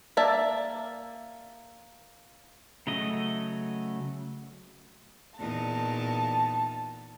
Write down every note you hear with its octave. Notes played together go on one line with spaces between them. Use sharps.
A#3 D5 E5 A5
C#3 F#3 A3 D#5
E2 A#2 D#4 A5